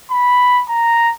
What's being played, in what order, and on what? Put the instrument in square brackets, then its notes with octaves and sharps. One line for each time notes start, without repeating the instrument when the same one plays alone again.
[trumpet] B5
A#5